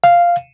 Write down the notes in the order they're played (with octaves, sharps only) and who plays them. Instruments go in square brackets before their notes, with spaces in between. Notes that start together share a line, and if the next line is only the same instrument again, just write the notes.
[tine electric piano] F5